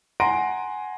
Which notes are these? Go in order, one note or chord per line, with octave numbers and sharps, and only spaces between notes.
F#5 G#5 A#5 C6 A#6 D7